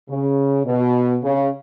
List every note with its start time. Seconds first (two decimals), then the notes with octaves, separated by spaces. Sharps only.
0.09 C#3
0.66 B2
1.23 C#3